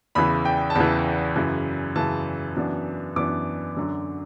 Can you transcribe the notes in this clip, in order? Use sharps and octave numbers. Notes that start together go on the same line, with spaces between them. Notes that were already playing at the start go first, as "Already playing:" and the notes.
E2 C#3 E3 B5
G5
A5
E2 C#3 E3 B5
F#2 C#3 E3
F#2 C#3 E3 A5
F#2 E3 B3 D4
F#2 E3 B3 D4 D6
F#2 D3 F#3